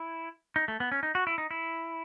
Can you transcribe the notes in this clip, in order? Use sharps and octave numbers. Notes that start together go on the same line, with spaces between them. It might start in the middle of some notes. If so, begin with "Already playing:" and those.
Already playing: E4
D#4
A3
B3
C#4
D#4
F#4
E4
D#4
E4